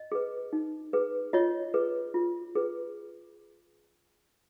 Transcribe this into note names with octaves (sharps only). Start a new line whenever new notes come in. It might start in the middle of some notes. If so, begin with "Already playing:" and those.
Already playing: D#5
G#4 B4
D#4
G#4 B4
F4 C#5 D#5
G#4 B4
F4
G#4 B4